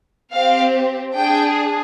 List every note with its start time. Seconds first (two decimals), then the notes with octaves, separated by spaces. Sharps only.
0.34 C4 G4 F5
1.14 D4 G#4 G5